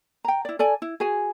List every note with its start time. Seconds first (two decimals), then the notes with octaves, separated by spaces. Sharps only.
0.25 G5 A#5
0.45 E4 D5
0.59 A4 D5 G#5
0.82 E4
1.00 F#4 G#4 G#5